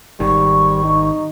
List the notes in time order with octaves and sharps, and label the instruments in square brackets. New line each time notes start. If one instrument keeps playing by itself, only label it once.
[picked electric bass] G#1 D#3 [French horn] G3 [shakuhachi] C#6
[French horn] D#4